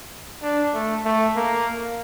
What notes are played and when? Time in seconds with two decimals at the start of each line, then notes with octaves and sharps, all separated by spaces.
0.43 D4
0.74 A3
1.05 A3
1.36 A#3